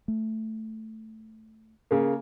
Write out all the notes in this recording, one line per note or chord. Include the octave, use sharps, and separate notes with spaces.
A3
C#3 A#3